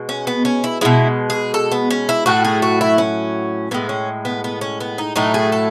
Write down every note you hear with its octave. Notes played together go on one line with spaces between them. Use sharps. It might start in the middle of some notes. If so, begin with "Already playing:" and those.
Already playing: B2 G#3
C#4
B3
C#4
E4
B2 G#3 E4
G#4
A4
B3
C#4
E4
A2 F#3 A3 F#4
G#4
F#4
E4
C#4
A2 G#3 B3
C#4
B3
B3
C#4
B3
D#4
A2 F#3 A3 D#4
G#4
A4